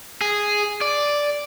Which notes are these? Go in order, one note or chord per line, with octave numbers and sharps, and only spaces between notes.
G#4
D5